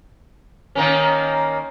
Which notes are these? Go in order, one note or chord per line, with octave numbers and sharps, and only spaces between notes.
D#3 A#3 C#4